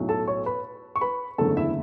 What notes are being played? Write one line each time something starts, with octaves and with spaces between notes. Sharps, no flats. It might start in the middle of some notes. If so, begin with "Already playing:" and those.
Already playing: B1 A2 F#3 A3
A4 A5
C#5 C#6
B4 B5
C#6
B4 B5
F#1 E2 D3 A3 A4 A5
E4 E5